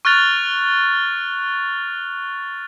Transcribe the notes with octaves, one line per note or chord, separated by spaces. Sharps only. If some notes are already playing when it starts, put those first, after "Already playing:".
C#6 F6 F#6 A6 F7 G7